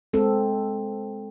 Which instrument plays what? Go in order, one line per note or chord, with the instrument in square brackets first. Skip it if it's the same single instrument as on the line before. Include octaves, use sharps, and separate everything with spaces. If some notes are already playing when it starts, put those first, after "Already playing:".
[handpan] G#3 C4 A4